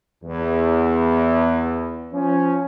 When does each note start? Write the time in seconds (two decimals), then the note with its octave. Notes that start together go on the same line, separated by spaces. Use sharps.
0.23 E2
2.13 F3 C#4